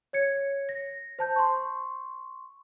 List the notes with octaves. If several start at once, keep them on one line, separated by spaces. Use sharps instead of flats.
C#5 G#6 C#7
A#6
C5 A5 G6
C6 C#6